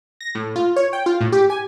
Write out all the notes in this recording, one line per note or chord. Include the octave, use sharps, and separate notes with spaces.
A#6
A2
F4
C#5
G5
F4
A2
G4
G#5